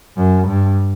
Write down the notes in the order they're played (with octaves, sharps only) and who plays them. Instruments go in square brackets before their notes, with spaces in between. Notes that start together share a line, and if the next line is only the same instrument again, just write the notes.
[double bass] F#2
G2